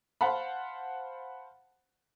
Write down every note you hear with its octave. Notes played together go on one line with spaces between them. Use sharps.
C5 F5 F#5 A5 B5